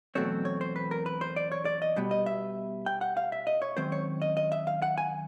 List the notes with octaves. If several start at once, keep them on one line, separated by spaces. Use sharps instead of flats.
E2 B2 F#3 A3 C4 C#5
C#5
C5
B4
A#4
B4
C5
D5
C#5
D5
D#5
B2 G3 B3
D#5
E5
G5
F#5
F5
E5
D#5
C#5
F#2 D#3 G#3 C4 C5
C#5
D#5
D#5
E5
F5
F#5
G#5